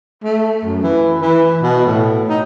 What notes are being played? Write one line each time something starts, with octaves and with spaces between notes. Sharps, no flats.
A3
F#2
E3
E3
B2
A2
D#4